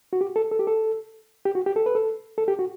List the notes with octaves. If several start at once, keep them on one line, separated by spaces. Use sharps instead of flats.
F#4
G4
A4
A4
G4
A4
G4
F#4
G4
A4
B4
A4
A4
G4
F#4